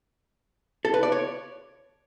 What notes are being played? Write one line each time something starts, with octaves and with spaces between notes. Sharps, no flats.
A4
B4
D5
C#5